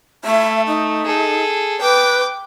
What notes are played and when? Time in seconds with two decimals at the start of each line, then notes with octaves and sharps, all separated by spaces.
0.25 A3 E5
0.67 D#4
1.05 G#4 A4
1.81 B4 G5 D6